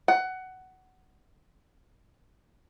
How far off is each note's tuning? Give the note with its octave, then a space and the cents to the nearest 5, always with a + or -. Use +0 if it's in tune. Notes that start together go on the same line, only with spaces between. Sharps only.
F#5 +15